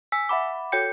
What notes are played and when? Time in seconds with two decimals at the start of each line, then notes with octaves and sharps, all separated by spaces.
0.12 G#5 E6 B6
0.29 E5 F#5 B5 D6
0.72 F#4 A4 C#5 G5 G6 C#7